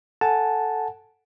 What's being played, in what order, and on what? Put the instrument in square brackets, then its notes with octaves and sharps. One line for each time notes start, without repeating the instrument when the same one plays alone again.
[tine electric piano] A4 F#5 G#5 A5